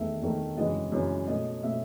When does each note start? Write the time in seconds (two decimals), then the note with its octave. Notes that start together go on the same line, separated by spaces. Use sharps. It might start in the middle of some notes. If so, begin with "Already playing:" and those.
Already playing: E2 D#3 A3 E5
0.22 E2 D#3 A3
0.57 F#2 C#3 E3 G#3 D#5
0.92 F#2 C#3 E3 G#3
1.27 B2 A3 D#5
1.63 B2 A3 E5